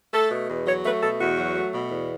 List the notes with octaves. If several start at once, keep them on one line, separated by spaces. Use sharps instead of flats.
A3 A4
B2
E2
F#3 C#5
A3 B4
B2 A4
E2 F#4
F#3
A3
B2
E2